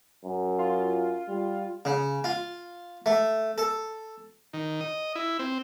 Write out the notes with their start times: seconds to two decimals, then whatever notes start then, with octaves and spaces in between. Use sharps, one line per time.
0.24 F#2
0.59 F4
1.28 G3
1.85 C#3
2.24 F4
3.06 A3
3.58 A4
4.53 D#3
4.81 D#5
5.15 E4
5.39 C4